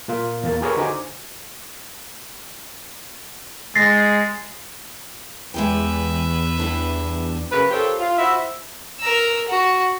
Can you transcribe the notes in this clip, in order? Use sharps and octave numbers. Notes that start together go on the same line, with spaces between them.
A#2 A#3 F4
E2 A#3 A6
F4 G4 G#4 A#4 B4 C#5
D3 D#4 F#4 C5 G#5 D6
G#3 A6 A#6 C7
E2 G#3 G4 B4 E5 G5
G3 D4 E4
F#2 C#3 A#3 B4
F4 G4 A4 A#4 C5 C#5
F4
E4 F#4 C5 E5
A#4 E6
F#4